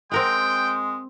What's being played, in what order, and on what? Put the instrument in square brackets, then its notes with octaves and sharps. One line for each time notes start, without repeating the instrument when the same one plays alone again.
[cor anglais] G#3 [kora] C4 A#4 F#5 [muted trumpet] G5